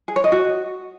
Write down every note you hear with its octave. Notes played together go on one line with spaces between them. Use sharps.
G#4
C#5
D#5
F#4